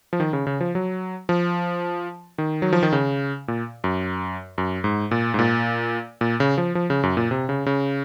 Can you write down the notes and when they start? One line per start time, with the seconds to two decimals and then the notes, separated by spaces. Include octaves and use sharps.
0.13 F3
0.20 D#3
0.33 C#3
0.47 C#3
0.61 F3
0.75 F#3
1.29 F3
2.38 D#3
2.62 F#3
2.73 F3
2.83 D#3
2.93 C#3
3.48 A#2
3.84 F#2
4.58 F#2
4.84 G#2
5.11 A#2
5.34 G#2
5.39 A#2
6.21 A#2
6.40 C#3
6.58 F3
6.75 F3
6.90 C#3
7.03 F#2
7.17 A#2
7.31 C3
7.49 C#3
7.66 C#3